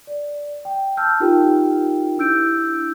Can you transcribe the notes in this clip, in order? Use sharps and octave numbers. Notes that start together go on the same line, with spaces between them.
D5
G5
A5 E6 F6 G6
D#4 F4 G4 A#4 G5
D4 E4 E6 G6 D7